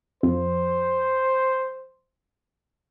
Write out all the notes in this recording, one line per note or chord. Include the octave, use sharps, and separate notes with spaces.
F2 C5